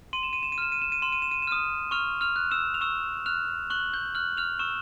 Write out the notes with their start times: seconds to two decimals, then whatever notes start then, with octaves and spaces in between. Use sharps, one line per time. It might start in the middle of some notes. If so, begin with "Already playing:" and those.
0.13 C6 D#7
0.23 E7
0.33 D#7
0.43 E7
0.52 D#7
0.58 F6 E7
0.72 D#7
0.82 E7
0.92 D#7
1.02 C6 E7
1.12 D#7
1.22 E7
1.31 D#7
1.42 E7
1.47 D#6 F6 D#7
1.91 C#6 F6 F7
2.21 F6 F7
2.36 F#6
2.51 E6 E7
2.74 F7
2.81 C#6 E6 E7
3.26 F6 F#6 F7
3.70 C#6 F#6 F#7
3.94 G6 G7
4.15 F6 F#6 F#7
4.37 F6 F7
4.59 C#6 E6 E7